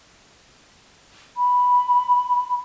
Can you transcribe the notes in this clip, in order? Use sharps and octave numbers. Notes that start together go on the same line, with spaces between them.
B5